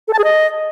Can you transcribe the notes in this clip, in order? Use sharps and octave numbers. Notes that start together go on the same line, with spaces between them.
A4
A5
G#4
D#5